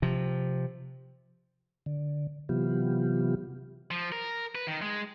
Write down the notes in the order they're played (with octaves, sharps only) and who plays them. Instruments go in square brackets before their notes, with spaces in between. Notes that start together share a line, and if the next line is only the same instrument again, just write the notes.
[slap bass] C3 F3
[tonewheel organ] D3
C3 E3 F#3 B3 F4 G4
[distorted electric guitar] F3
A#4
B4
D#3
G#3